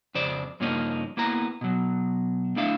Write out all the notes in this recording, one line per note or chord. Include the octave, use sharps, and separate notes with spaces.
F2 C#3 C5 D5
G2 C#3 F3 A#3 C#4 D#4
A#3 B3 E4 A#5
B2 F#3
A3 D4 E4 E5 F5